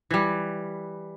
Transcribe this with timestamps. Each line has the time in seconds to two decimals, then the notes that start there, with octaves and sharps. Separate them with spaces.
0.11 E3 G3